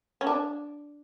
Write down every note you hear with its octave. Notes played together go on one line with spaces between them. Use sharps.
C#4
D4